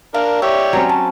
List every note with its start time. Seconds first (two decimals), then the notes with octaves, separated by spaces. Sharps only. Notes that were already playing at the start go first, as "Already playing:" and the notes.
0.14 D4 A#4 F5
0.42 G4 C#5 D5 E5
0.73 F#3 C4 C#4
0.89 A5